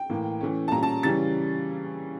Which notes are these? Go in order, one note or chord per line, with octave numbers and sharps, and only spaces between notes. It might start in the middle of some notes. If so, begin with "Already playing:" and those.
Already playing: G5
A2 E3 A#3
E3 A3 C#4
A5
A#2 G3 C#4 A#5
A5
C#3 E3 G3 C#4 A6